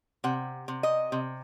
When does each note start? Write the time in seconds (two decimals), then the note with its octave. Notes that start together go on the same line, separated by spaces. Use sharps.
0.24 C3 F#5
0.68 C3
0.83 D#5
1.12 C3